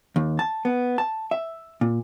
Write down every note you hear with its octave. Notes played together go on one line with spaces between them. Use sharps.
D#2
A5
B3
A5
E5
A#2